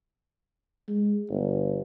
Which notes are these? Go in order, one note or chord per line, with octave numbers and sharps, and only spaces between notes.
G#3
G1